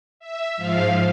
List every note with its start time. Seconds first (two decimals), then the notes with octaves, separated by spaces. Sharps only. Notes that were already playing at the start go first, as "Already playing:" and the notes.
0.20 E5
0.57 G#2 F3 F5